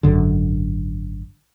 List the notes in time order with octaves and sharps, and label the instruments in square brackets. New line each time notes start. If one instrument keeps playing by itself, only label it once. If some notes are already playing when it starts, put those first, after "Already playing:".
[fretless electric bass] G#1 F#2 D3